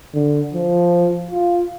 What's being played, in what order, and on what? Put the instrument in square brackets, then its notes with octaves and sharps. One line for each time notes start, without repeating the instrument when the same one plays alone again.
[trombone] D3
F3
F4